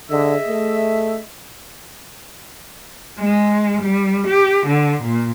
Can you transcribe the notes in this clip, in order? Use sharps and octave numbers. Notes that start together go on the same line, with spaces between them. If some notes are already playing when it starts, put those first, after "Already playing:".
D3 G#4 D#5 E5
A3
G#3
G3
G4
D3
A#2